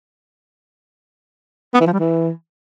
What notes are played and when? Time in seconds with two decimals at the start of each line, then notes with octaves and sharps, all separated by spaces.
1.74 B3
1.80 E3
1.87 F3
1.93 G3
2.00 E3